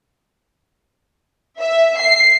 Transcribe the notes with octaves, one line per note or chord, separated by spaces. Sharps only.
E5
C7